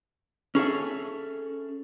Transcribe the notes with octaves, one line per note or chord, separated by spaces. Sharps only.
C#4 G#4 A4 E5